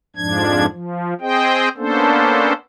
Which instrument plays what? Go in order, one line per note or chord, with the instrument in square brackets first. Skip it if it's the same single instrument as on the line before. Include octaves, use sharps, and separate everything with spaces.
[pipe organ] F2 G#2 F3 D4 G#6
F3
C4 G#4 C5 D#5 G5
A#3 B3 C#4 D4 A4 C5